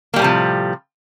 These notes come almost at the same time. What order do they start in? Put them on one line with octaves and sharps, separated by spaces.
A#3 G3 A2 C3 F3